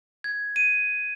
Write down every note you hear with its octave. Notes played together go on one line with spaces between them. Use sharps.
G#6
D#7